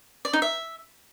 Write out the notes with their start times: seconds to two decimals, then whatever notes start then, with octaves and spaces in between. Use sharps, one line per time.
0.25 D5
0.33 D#4
0.42 E5